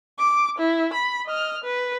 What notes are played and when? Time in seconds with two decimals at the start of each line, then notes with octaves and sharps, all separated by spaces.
0.19 D6
0.58 E4
0.93 B5
1.26 D#5 F6
1.64 B4